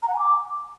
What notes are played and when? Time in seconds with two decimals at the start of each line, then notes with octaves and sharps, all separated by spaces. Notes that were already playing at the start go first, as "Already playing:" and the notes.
0.03 A#5
0.08 F#5
0.14 G#5
0.19 D6